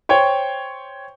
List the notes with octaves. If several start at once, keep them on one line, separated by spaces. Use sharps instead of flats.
C5 C#5 G5